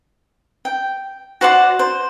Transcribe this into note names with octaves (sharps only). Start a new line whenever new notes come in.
G5
F#4 C5 D5 F#5
C5